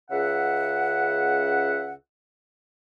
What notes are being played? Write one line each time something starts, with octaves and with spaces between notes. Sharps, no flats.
C#2 C#3 E5 F#5